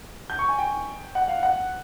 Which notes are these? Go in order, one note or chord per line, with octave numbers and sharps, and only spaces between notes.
G6
C#6
G#5
G5
F#5
F5
F#5